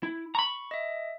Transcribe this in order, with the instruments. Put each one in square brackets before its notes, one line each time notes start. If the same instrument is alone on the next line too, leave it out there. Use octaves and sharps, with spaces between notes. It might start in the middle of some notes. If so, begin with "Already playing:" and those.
[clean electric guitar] E4
[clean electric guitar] A#5 B5 [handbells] C#6
[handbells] D#5 E5